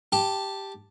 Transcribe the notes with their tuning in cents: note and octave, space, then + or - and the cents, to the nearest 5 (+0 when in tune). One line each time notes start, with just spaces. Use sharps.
G4 +0 A5 +0